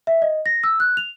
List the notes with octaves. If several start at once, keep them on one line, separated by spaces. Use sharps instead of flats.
E5
D#5
A#6
E6
F#6
F7